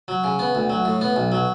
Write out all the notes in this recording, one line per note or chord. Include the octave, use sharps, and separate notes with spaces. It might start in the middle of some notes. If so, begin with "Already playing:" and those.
F#3
C#3
B3
D2
F#3
A2
B3
B1
F#3